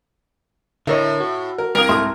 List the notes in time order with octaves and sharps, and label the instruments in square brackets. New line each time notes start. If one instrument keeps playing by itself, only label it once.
[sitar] A2 [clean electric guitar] D3 A#4 C#5 [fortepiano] E4 D#5
[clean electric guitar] F#4
[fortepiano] A#4
[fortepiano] C2 F5 D#6 [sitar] A#4
[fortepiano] C2 A3 D#6 [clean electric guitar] G#2 E5 C6